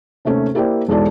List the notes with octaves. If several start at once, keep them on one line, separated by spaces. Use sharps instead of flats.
D#2 C3 A3 C#4 A4
A#3 E4 G4 C5 D5 G5
E1 G#2 E3 A4 D5 A5